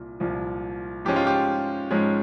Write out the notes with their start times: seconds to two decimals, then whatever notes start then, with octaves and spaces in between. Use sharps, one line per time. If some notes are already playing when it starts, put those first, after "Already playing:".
Already playing: C2 A#2
0.20 C2 A#2 F3
1.05 G#2 F3 G#3 C#4 G4
1.16 F4
1.27 G4
1.91 G#2 F3 G#3 C#4